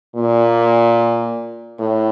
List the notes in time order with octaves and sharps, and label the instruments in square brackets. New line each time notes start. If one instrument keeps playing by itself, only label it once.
[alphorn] A#2
A2